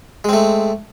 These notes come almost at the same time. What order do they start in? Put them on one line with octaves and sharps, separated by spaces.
G#3 C4 A3